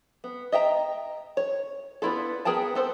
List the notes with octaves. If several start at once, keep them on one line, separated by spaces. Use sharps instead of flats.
B3
D#5 E5 G5 A#5
C#5
B3 D4 E4 F4 A4
B3 G#4 A#4 G5 A5
B3 A4 C5